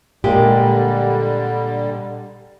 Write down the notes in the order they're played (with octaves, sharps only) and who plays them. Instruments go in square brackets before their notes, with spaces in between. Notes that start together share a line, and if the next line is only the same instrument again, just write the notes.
[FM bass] A#2 [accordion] D3 G3 [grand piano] G#3 A#3 [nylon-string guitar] G4